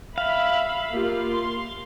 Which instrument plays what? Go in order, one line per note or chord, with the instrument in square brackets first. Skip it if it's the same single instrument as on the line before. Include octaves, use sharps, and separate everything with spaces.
[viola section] E5 B5 [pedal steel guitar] F5
[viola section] A#3 F4 G4
C6